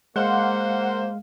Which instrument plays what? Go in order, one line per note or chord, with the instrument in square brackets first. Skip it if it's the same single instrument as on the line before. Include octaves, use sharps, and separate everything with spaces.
[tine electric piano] G#3 F5 [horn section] A#3 C5 [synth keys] F#5